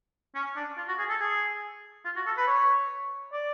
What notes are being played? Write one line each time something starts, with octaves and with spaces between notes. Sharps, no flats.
C#4
D4
F4
F#4
G#4
A4
G#4
F4
F#4
A4
B4
C#5
D5